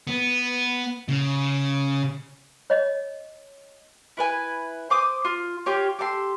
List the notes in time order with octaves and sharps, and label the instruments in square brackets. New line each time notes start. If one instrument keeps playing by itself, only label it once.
[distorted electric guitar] B3
C#3
[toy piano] C#5 D#5
[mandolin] E4 B4 G#5
C5 D6 D#6
F4
F4 G4 C#5
G4 A4 A#5 C6